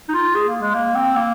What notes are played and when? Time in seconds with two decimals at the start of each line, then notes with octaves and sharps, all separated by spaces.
0.09 D#4
0.14 F4
0.35 G#4
0.48 A#3
0.61 G#3
0.74 A#3
0.95 C4
1.16 A#3